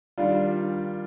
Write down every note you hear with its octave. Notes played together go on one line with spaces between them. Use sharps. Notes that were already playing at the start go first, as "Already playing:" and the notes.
D#3 G3 D4 F4